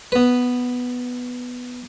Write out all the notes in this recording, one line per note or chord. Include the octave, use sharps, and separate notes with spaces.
B3 B4